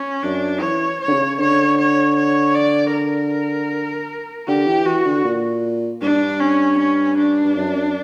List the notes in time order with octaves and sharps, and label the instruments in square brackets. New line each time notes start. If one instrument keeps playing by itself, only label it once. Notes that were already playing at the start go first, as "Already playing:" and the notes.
Already playing: [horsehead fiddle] C#4
[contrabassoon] F#2 [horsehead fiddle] D4
[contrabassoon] E3 [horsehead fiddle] C#5
[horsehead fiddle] C#5
[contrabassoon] D3
C#3
[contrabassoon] D3 [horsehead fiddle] C#5
[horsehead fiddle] C#5
C#5
D5
A#4
[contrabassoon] D3 [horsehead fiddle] G4
[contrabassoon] E3
[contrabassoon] E3 [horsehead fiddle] F#4
[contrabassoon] D3
A#2
[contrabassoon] G2 [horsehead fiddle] D4
[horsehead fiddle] C#4
C#4
D4
[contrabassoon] G2
F#2
F#2